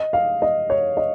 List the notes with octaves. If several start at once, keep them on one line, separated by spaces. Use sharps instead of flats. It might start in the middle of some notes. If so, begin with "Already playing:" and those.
Already playing: D#5
F5
D#5
C#5
D#5